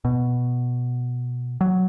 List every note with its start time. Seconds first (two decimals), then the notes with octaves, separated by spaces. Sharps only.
0.05 B2
1.61 F#3